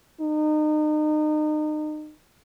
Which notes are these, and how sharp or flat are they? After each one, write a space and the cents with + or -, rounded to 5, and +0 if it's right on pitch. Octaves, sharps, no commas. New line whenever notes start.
D#4 -35